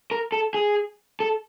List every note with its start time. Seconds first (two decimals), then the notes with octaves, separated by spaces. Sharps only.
0.11 A#4
0.32 A4
0.54 G#4
1.20 A4